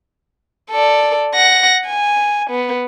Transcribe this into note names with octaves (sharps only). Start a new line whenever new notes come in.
A4 D5
F#5 A#6
G#5
B3